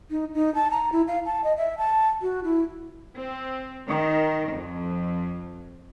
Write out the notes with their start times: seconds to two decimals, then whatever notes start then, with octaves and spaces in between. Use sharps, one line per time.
0.11 D#4
0.34 D#4
0.55 A5
0.71 A#5
0.92 E4
1.08 F5
1.26 A5
1.44 D#5
1.57 E5
1.78 A5
2.22 F#4
2.44 E4
3.16 C4
3.88 D#3
4.51 F2